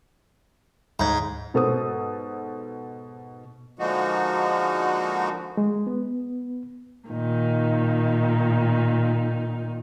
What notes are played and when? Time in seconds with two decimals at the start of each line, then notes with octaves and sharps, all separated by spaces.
1.00 D2 G#2
1.54 G#2 B2 A4 C5 D#6
3.79 D3 F3 G#3 A#3 D#4 F#4
5.57 G#3
5.87 B3
7.08 A#2 D#3 D#4